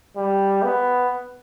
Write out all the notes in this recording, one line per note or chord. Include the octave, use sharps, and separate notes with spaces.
G3
B3